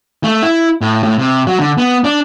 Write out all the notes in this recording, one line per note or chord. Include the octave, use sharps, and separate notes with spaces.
A3
E4
A2
A2
C3
F#3
D3
B3
D4